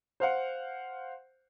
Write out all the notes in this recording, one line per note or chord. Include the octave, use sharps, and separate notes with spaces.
C5 F5 F#5